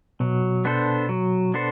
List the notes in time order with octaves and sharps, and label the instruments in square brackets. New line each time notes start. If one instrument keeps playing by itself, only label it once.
[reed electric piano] B2 [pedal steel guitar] F#3
[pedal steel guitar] B3 D4 A4 C5
F#3
B3 D4 A4 C5